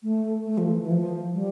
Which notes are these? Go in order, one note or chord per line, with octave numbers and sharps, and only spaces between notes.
A3
A3
F3
E3
E3
F3
G3